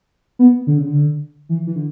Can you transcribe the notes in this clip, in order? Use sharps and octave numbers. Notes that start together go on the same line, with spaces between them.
B3
D3
C#3
D3
E3
E3
D3